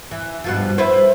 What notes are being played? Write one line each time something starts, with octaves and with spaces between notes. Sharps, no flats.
E3
G2 B2 F3
E4 B4 C5